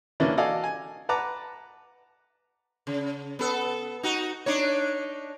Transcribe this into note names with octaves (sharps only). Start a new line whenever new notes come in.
E3 A#3 C#4 D4
F#4 A4 D5 D#5 F5 G#5
G#5
B4 F#5 A5 A#5 D6
C#3
B3 A4
D#4 F#4
D4 D#4 C#5